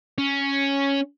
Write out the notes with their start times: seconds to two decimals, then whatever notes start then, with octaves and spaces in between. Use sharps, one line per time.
0.18 C#4